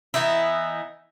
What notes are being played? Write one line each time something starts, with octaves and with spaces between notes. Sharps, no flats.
E3 B3 D#4 E4